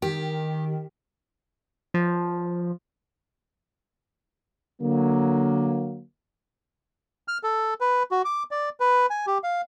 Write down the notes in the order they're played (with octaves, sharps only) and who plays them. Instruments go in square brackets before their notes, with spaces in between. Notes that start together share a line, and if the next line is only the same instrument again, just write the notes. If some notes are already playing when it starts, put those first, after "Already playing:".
[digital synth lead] D#3 [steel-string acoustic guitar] G4
[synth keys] F3
[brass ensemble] D3 F#3 A#3
[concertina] F6
A4
B4
F#4
D6
D5
B4
G#5
G4
F5